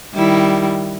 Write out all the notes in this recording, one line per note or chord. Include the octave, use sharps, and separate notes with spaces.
D#3 G3 E4